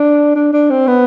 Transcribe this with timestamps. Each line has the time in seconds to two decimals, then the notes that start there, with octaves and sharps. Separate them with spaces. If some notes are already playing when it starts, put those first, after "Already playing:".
Already playing: D4
0.36 D4
0.53 D4
0.71 C4
0.88 B3